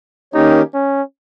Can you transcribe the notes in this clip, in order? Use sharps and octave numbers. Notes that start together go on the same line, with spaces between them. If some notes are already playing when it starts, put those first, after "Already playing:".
D#3 A#3 C#4 D#4 G4 C#5
C#4